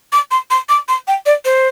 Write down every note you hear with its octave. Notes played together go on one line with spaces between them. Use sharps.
D6
C6
C6
D6
C6
G5
D5
C5